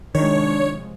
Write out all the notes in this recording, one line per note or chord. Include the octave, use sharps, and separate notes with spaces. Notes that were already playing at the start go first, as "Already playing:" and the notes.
C3 D#3 F3 G#3 D4 C#5